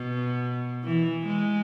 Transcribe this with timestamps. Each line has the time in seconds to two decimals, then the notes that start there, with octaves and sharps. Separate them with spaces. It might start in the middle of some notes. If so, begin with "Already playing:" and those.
Already playing: B2
0.84 E3
1.26 G#3